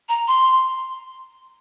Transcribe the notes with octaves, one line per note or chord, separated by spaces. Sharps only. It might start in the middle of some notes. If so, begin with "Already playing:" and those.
A#5
C6